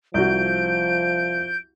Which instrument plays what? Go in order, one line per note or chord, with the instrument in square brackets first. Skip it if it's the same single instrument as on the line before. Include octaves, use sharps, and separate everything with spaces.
[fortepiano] C2 F#4 [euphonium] F3 [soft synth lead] G6 [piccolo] D7